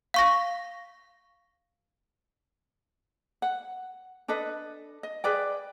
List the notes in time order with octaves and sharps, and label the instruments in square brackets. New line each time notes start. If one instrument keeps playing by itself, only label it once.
[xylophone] F5 C#6 A#6
[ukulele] F#5
D4 A4 B4 D#5
D#5
G#4 B4 D5 G5